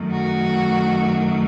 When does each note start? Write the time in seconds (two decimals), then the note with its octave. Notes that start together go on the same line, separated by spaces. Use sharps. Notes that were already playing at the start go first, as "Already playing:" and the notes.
Already playing: F#2 D#3 A3
0.12 F#4